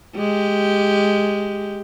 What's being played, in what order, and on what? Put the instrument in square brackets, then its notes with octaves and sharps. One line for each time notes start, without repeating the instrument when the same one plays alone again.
[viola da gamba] G#3 G4